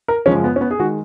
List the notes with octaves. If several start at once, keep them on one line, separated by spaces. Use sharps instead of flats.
A#4
F#2 C#3 F3 G#3 C#4
B3
C#4
B3
G#4
D#3 G#3 F#4